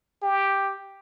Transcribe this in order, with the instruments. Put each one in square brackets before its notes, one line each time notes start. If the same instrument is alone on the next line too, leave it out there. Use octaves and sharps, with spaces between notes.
[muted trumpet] G4